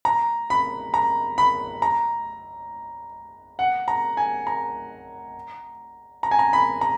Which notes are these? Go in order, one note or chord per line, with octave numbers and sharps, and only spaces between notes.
A#5
B5
A#5
B5
A#5
F#5
A#5
G#5
A#5
A#5
G#5
A#5
B5
A#5